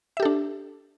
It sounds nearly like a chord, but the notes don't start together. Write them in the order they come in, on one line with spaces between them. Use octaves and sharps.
E5 G4 A4 D4